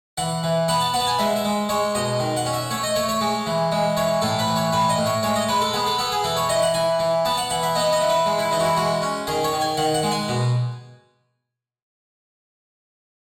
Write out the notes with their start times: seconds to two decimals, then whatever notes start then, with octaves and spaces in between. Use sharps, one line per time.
0.18 E3 F#5
0.43 E3
0.68 B3 F#5
0.81 A5
0.94 B3 F#5
1.00 A5
1.07 G#5
1.19 G#3 E5
1.36 E5
1.45 G#3
1.69 G#3 C#5
1.95 B2 D#5
2.19 D#3
2.36 F#5
2.46 C#4
2.54 E5
2.70 A3 C#5
2.83 D#5
2.96 A3 C#5
3.09 C#5
3.21 G#3
3.46 E3
3.72 G#3
3.97 E3 C#5
4.22 A2 A4
4.39 B4
4.47 E3
4.56 C#5
4.73 A2 B4
4.89 D#5
4.98 A2
5.06 C#5
5.23 G#3 C#5
5.36 D#5
5.48 G#3 B4
5.61 A4
5.73 B3 G#4
5.86 A4
5.99 B3 A4
6.12 G#4
6.24 E3 A4
6.37 C#5
6.49 E3 D#5
6.62 F#5
6.74 E3 G#5
6.99 E3
7.25 B3 A5
7.37 F#5
7.50 E3 F#5
7.63 E5
7.75 B3 D#5
7.92 D#5
8.01 E3
8.09 B4
8.26 G#3
8.38 E4
8.51 E3 D#4
8.60 F#4
8.64 E4
8.77 G#3 F#4
9.02 C#4
9.27 D#3 G#4
9.44 C#5
9.53 D#3
9.61 G#5
9.77 D#3 F#5
9.94 F#5
10.03 G#3
10.11 G#5
10.28 B2